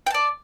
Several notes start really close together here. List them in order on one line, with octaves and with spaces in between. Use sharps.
G5 A5 D5